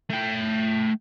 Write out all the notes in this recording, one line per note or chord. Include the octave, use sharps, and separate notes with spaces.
A3 G5